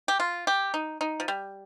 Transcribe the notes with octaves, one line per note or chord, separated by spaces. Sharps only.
G4
F4
G4
D#4
D#4
F3
G3